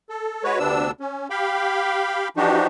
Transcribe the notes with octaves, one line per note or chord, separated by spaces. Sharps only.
A4
G#3 F#4 B4 C#5
D2 C3 B3 D4 E6
C#4
G4 F5 G5 B5
E3 F3 D4 D#4 F#4 G4